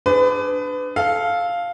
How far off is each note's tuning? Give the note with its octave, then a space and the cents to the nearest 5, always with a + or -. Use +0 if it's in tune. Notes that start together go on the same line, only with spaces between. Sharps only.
D4 +5 G#4 +0 B4 +30
A4 -15 F5 +0